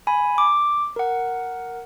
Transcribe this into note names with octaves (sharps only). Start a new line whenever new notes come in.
G#5 B5
D6
A#4 F#5